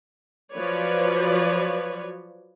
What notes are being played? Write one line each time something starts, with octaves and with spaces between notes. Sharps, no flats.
F3 F#3 F#4 B4 C#5 D5